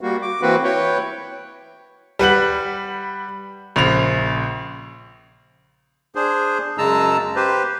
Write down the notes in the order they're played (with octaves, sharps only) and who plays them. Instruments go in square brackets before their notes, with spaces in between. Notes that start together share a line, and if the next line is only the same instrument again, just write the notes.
[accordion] G3 A#3 F#4
D6
E3 A#3 C4 F#4 B4
E4 B4 C#5 G5
[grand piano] G3 B4 F#5 F#7
A#1 C#3 F7
[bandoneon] D4 G#4 C5
F#2 C#3 G#3 A5 A#5 E6
G4 B4 C5